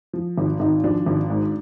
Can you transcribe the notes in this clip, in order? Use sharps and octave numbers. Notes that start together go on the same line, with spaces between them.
F3
G#1
G#1 D#4
F3 D4
G#1
G#2